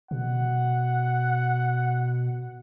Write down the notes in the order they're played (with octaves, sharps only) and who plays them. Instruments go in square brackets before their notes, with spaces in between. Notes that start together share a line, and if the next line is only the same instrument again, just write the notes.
[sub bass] B2 [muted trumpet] F#5